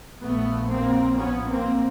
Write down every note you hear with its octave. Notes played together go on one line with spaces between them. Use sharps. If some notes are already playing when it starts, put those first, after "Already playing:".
A#1 A#2 A3 B3
A#3 C4
B3 C#4
A#3 C4